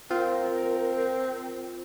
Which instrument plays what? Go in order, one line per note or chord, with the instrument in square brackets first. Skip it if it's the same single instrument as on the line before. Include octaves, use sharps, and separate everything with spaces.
[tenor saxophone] C4 [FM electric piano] F4 [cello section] A#4